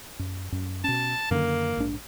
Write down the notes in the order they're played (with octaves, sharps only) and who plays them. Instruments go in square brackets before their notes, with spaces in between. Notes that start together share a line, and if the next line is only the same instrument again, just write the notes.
[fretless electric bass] F#2
F#2
[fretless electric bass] B2 C#4 [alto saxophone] A5
[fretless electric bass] F#2 D3 D#3 [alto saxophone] A#3
[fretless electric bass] A#1 G#2 D4